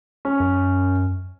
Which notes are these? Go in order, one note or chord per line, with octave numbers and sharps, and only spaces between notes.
C#4
F#2